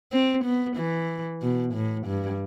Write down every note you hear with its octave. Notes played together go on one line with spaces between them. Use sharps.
C4
B3
E3
B2
A2
G2